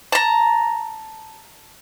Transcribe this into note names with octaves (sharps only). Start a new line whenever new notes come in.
A5 A#5